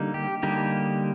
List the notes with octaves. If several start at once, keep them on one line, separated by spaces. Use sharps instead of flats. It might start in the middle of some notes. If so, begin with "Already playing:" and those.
Already playing: D3 G3 A#3 D#4
G4
D3 G3 A#3 D#4 G4